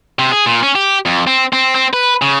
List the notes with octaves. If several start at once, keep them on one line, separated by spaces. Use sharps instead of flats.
C3
G#4
A#2
C#4
G4
F2
C4
C4
C4
B4
C#3